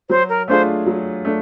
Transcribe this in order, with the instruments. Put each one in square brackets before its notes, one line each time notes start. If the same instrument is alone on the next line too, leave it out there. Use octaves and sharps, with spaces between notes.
[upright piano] F#3 [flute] C5
[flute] A#4
[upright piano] A3 D4 F4 G#4 [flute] C5
[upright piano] F#3
A3 D4